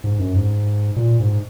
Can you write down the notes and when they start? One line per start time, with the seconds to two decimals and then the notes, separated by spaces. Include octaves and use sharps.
0.04 G#2
0.19 F#2
0.35 G#2
0.96 A#2
1.20 G#2